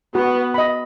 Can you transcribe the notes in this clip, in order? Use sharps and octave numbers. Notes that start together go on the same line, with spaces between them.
B3 F#4
D#5 B5